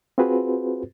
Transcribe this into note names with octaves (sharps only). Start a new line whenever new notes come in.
C4 F4 F#4 G#4 B4 C5